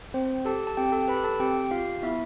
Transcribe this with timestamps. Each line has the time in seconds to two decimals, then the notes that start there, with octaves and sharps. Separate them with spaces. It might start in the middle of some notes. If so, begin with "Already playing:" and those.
0.14 C4 C5
0.45 G4 A4 A5
0.67 A5
0.77 C4 G4 G5
0.92 A4 A5
1.08 G4 B4 B5
1.24 A4 A5
1.39 C4 G4 G5
1.71 F4 G4 F5
2.02 B3 E4 E5